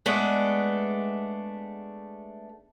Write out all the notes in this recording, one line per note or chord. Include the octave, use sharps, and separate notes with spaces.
G#3 A3 B3 D4